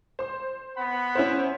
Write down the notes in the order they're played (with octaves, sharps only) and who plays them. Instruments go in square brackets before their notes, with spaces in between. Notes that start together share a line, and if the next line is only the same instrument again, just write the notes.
[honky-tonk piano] C5 C6
[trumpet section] B3 F#5 B5
[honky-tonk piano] C#4 E4 C5